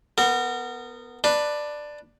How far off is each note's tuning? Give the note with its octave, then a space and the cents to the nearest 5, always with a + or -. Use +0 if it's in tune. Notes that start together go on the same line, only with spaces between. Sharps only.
B3 +0 A#4 -30
D4 +10 B4 +0